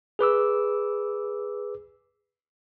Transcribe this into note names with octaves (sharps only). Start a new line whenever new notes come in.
G#4 B4 D6 E6